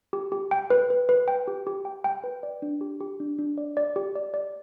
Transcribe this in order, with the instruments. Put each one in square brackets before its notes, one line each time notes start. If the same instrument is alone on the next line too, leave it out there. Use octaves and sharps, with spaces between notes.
[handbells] G4
G4
G5
B4
B4
B4
G5
G4
G4
G5
G5
B4
D5
D4
G4
G4
D4
D4
D5
D5
G4
D5
D5